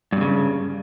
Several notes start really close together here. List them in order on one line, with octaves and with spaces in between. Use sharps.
G2 A#2 C#3